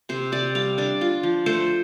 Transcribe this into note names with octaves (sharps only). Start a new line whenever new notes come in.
C3 C5
C3 D5
G3 F5
D4 D5
F4
F3
A3 C5